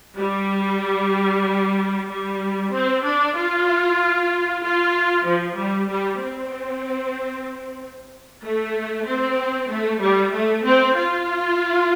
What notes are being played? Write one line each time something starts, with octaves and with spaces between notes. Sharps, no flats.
G3
G3
C4
D4
F4
F4
F3
G3
G3
C4
A3
C4
A3
G3
A3
C4
F4